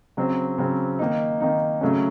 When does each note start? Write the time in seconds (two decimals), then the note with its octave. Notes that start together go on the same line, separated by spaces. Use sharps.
0.17 C#3 F#3 C4
0.58 C#3 F#3 C4
0.99 D#3 A#3 D#4
1.40 D#3 A#3 D#4
1.81 C#3 F#3 A3 C#4